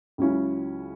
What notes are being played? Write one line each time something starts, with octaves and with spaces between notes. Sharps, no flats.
C#2 C#3 F#3 C#4 E4